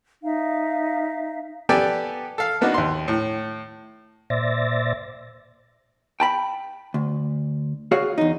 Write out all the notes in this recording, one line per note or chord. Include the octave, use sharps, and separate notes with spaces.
D#4 E5 F5
B3 G4 A4 D5 G5 G#5
A4 F5
A#3 B3 D4 D#4 F#4
D#2 C6
A2
A#2 C5 D5 E5 A6 A#6
G5 A5 B5
D2
F#4 G#4 C#5 F5
E2 D#4